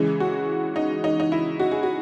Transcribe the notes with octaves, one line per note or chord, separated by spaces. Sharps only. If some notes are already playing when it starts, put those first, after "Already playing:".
Already playing: C#3 E3 G#3
F#4
D#4
D#4
D#4
E4
F#4
G#4
F#4